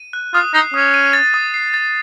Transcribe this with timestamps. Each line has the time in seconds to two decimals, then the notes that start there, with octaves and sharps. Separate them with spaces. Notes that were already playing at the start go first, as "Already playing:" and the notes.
Already playing: D#7
0.13 F#6
0.34 F4 D#6
0.54 D#4 C7
0.74 C#4 D#6
0.94 D#7
1.13 A6
1.34 D#6
1.54 C7
1.74 A6